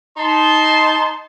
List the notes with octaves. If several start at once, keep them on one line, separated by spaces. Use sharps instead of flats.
D#4 A5 C6